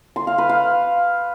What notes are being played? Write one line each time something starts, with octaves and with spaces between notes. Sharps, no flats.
C6
F5
B4
F5